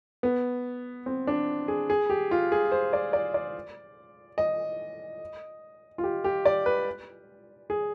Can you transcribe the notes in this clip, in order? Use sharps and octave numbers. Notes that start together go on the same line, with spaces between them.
B3
C4
D4
G#4
G#4
G4
F4
G#4
C5
D5
D5
D5
D#5
F4
G4
G4
D5
B4
G#4